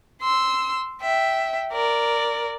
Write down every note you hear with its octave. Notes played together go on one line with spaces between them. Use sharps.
C6 E6
E5 G5
A#4 D5